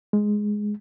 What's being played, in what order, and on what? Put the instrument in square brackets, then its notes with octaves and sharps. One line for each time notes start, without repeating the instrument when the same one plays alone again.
[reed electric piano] G#3